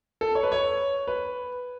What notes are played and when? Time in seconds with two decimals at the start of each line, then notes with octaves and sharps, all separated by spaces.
0.21 A4
0.35 C#5
0.43 B4
0.52 C#5
1.07 B4